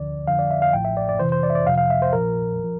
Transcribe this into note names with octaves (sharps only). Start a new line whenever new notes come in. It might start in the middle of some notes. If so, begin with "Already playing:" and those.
Already playing: D2 D3 F3 D5
F2 D3 F3 F5
D5
E5
F5
A1 A2 F3 G5
E5
D5
D5
F2 C3 E3 C5
C5
D5
E5
D5
F2 C3 F3 F5
F5
E5
C5
A#1 A#2 F3 A#4
F3